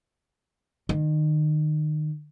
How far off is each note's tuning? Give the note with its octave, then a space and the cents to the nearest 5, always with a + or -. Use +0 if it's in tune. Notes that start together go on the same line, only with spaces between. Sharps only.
D#3 -30